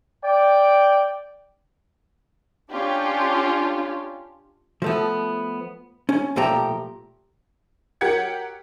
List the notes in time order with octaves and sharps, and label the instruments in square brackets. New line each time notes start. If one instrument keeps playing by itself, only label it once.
[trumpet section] D5 G5
[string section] C#4 D4 F4 G4
[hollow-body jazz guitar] F3 A3 B3
C#4
B1 A#2 F3 A3 G4 A#5
[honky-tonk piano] F#3 G4 A#4 F#5 G#6 C#7